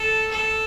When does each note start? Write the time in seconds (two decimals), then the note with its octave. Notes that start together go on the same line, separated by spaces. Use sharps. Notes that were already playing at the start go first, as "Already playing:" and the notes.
Already playing: A4
0.32 A4